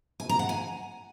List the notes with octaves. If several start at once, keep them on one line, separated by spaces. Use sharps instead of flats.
G#5
A#5
F#5
G#5